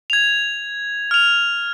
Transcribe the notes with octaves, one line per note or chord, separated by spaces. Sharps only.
G#6 F7
F6 F7